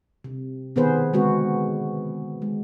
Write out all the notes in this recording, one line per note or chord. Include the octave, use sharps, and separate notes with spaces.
C3
B2 D#3 B3 G#4 B4 C5
D3 G#3 B3 C4 F#4
G#3